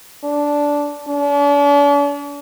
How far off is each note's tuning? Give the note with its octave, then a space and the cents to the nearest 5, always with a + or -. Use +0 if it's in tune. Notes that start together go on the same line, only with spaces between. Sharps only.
D4 -10
D4 -45